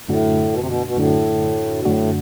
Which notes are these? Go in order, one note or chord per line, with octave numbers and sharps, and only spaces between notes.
F#2 A2 D3 A3 D4 F#4
B2
C3
B2
B2
F#2 A2 D3 A3 D4 F#4
B2
F#2 A2 D3 A3 D4 F#4